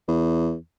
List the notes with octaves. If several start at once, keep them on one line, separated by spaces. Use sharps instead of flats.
E2